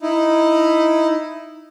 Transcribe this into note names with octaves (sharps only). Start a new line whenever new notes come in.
D#4 E4